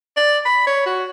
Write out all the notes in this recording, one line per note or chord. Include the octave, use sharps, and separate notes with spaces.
D5
B5
C#5
F#4